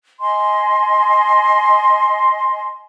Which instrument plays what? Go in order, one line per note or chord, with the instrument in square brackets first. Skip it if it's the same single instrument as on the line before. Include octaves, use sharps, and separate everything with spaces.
[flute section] D#5 G#5 C6